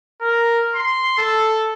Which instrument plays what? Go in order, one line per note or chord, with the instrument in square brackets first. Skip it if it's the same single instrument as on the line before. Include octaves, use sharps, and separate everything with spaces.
[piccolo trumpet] A#4
C6
A4